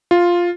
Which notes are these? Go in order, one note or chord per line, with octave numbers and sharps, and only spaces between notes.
F4